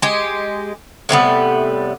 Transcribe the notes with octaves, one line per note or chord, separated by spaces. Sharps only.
G#3 G4
A2 C3 G3 B3